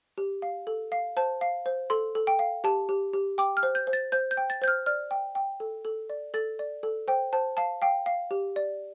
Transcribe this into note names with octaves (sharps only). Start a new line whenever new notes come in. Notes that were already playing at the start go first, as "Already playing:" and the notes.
G4
F5
A4
F5
C5 A5
F5
C5
A4 C6
A4
G5
F5
G4 A5
G4
G4
G5 D6
F6
C5
G6
C5
A6
C5 G6
G6
G5
A6
C5 G6
F6
D5 F6
G5
G5
A4
A4
D5
A4 A6
D5
A4
C5 G5
C5 A5
F5 A5
F5 G5
F5
G4
D5